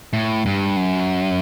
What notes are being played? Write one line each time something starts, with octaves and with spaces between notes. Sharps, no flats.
A2
G2
F#2